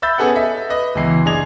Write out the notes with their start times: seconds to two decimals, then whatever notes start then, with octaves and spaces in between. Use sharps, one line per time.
0.02 E5 B5 E6 G6 A6
0.18 B3 C#4 G#4 A4 B4 F#5
0.35 A4 D#5 E5
0.70 B4 D#5
0.95 C#2 B2 E3 C7
1.25 F#1 D4 G#4 D#5 G#6 F7